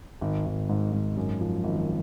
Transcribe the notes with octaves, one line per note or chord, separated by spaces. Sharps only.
G#1
G#1
G#2
G#2
F#2
F3
G#1